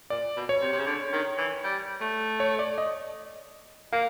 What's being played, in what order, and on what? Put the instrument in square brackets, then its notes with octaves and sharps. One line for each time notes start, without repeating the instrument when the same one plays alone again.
[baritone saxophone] A#2 [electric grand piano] D5
[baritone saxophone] B2
[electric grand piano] C#5
[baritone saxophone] C3
C3
C#3
D3
D#3
E3
G3
A3
[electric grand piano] C#5
D5
D#5
[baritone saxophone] A#3 [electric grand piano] F5